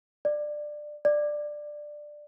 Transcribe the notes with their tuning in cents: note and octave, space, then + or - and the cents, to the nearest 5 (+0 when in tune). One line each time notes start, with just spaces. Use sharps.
D5 +20
D5 +15